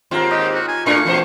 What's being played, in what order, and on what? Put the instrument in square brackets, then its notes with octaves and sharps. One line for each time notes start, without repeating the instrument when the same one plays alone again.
[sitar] D#2 G#2 C4 [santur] F4 A#4
[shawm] G4 [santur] D#5
[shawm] F#4
G#5
[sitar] A2 D4 A#4 [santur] A3 F5 [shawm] C#6
[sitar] E2 B2 C5